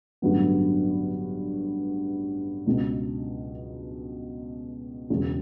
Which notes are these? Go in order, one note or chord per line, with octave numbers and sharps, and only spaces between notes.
A1 G2 D3 F#3 B3
C#2 B2 G#3
E1 E2 C#3